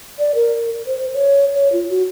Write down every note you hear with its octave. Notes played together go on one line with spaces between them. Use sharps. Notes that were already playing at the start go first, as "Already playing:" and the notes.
D5
A#4
C5
C#5
C#5
F4
F#4